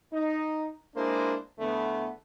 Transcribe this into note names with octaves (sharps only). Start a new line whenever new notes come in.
D#4
G#3 A#3 D4 E4 C5
E2 D3 A3 B3